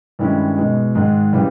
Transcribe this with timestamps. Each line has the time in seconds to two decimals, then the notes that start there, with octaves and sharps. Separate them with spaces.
0.19 G2 D#3 G#3 C#4 E4
0.57 B2 G#3 D#4
0.95 G#2 D#3 G#3 D#4
1.33 C#3 E3 G3